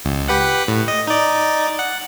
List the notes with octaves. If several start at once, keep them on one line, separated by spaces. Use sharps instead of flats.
C#2
G4 B4 F#5
A2
D#5
D#4 D5
F#5